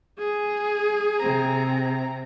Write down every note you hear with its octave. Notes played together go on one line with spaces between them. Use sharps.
G#4
C3 C4 A#5